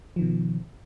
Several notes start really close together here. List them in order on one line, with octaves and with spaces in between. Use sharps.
F3 D#3 B2